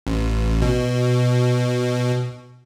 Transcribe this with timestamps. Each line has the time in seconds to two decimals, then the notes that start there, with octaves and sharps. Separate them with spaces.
0.07 A1
0.62 B2